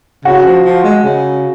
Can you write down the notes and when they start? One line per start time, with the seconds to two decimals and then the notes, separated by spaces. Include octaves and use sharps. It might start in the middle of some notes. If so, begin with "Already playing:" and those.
0.25 C#3 F#4
0.45 F3
0.64 F3
0.84 G#3
1.04 C#3